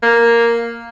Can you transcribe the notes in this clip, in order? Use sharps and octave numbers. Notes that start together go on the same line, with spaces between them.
A#3